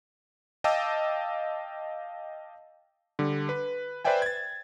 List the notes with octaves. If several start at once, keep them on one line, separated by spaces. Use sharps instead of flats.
D#5 F5 G5 A5 D6 E6
D3 G3
B4
B4 C5 D5 E5 G5 G#5
G#6 A6